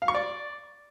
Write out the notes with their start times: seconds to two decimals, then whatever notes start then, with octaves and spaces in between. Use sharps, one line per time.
0.02 F5
0.08 C#6
0.15 D5